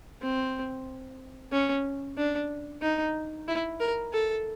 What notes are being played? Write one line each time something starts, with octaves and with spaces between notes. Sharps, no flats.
C4
C#4
D4
D#4
E4
A#4
A4